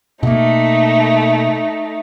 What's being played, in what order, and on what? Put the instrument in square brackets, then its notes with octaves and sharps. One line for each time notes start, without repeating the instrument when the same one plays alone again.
[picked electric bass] B2 A#3 [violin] A3 D#4